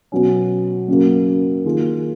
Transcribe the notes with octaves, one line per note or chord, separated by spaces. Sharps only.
B2 F#3 C#4
F#2 C#3 F#3 A#3
D#3 A#3 F4 G#4